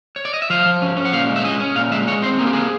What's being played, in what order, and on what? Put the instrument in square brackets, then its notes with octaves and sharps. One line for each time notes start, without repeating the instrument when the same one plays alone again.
[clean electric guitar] C#5
D5
D#5
E5
F3 F5
F3
C#4
C#4
F#5
A#2 F5
G#3
E5
C#4 D#5
C#4
A#2 F5
G#3 E5
G#3 C#5
C4 C5
A#3 G#4
G4
A#3 G#4